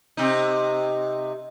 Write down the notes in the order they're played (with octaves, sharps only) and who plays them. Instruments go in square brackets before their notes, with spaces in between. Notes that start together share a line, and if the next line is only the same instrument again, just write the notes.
[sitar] C3 D#4